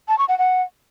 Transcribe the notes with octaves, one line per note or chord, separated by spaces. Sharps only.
A5
C#6
F#5
F#5